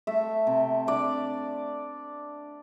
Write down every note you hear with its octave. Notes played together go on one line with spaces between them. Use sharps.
A3 E5
C3
D4 D5